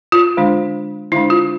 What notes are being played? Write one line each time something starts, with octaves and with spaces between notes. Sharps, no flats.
F4
D3 G#3 D4
D3 G#3 D4 E4
F4